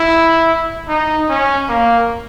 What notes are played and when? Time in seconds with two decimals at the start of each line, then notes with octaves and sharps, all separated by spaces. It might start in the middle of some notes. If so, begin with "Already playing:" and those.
Already playing: E4
0.89 D#4
1.29 C#4
1.69 A#3